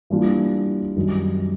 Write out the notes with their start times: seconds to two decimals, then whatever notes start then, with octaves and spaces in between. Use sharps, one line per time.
0.10 E3 G3 A#3 D4 F4
0.96 F#2 D#3 G3